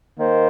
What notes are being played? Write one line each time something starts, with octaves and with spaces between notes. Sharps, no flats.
D#3 A#3 C5